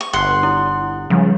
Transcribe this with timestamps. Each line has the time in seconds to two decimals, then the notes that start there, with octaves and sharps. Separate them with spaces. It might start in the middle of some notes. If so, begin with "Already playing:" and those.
0.01 C#6
0.13 G1 F#5 C6
0.43 E4
1.10 C#3 F3 G3